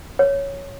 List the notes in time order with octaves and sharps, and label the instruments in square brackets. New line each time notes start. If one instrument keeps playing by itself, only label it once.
[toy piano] C#5